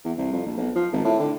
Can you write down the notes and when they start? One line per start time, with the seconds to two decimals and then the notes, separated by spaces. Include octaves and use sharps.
0.04 E2
0.18 C2
0.32 F2
0.46 A#1
0.57 B1
0.75 F3
0.92 G#1
1.04 A2
1.19 D3